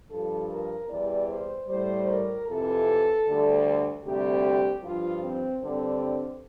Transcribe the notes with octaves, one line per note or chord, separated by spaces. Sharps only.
G2 F3 A4
A#4
E2 E3 G3 D5
C5
A2 G3 C5
A#4
F2 C3 E3 A4
D2 D3 G3
D2 C3 G3 G4
G2 F3 F4
C4
G2 D3 G3 C4